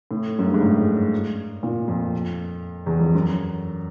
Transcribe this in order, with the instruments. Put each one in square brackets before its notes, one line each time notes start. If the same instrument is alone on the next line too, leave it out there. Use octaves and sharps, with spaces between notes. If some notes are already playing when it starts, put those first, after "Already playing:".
[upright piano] A2
F#2
G2
G#2
A2
A#2
F2
E2
F2
F#2